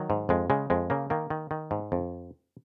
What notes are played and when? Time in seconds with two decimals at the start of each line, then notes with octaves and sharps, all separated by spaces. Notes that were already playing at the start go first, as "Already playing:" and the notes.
Already playing: D#3 F#3
0.10 G#2
0.29 F2 G#3
0.50 C#3 G#3
0.70 F2 G#3
0.90 C#3 A#3
1.10 D#3 A#3
1.30 D#3
1.51 D#3
1.71 G#2
1.92 F2